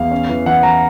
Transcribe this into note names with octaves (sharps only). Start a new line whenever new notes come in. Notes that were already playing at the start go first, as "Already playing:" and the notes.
Already playing: E2 F5
C#4
E3
E3 F#5
E3 A#5